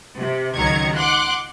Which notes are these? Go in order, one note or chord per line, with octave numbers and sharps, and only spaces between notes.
C3
C#2 D#3 F#3 A#5 G#6 C#7
F#5 C6 D6 F#6